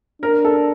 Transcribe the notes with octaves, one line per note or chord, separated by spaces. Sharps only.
D4 A#4
A4